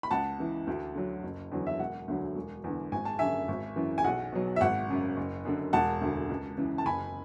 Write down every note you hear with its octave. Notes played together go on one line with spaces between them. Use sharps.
B5
C#2 F#5 A5
C#3 E3
D2
D3 F#3
F#1
E2 D3 F#3
E5
E1 F#5
D2 D3 F#3
E1
E2 D3
G#1 G#5
A5
F#2 D3 E5 G#5
G#1
F#2 E3
G#5
B1 F#5
B2 F#3
E5
G#1 F#5
F#2 C#3
F#1
F#2 D3
E1 F#5 A5
D2 D3
C#2
C#3 E3
A5
F#1 G#5 B5